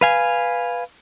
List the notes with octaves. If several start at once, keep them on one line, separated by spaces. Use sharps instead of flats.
B4 F5 G#5